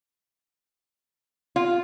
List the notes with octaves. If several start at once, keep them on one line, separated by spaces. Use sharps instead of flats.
F4